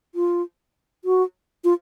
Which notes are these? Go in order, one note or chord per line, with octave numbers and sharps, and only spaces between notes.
F4
F#4
F4